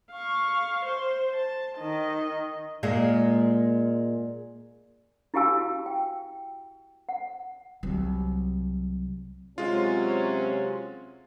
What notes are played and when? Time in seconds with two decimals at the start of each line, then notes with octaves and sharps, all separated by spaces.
0.12 F5 C#6
0.85 C5
1.35 A5
1.78 D#3 D#5
2.83 A#2 G#3 A#3
5.34 E4 F#4 G4 F5 G#5 E6
5.86 G5
7.09 F#5
7.83 C2 F#3
9.58 C3 F#3 G#3 C#4 F4